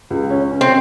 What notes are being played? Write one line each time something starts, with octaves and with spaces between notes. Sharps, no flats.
C#2
C#4
C#4
C4